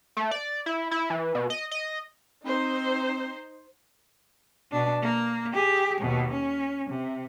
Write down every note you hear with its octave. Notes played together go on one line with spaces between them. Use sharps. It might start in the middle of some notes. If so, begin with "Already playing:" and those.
A3
D5
E4
E4
E3
B2
D#5
D#5
C4 D#4 C5
B2 D4
A#3
G4 G#4
D#2 B2
C#4
C3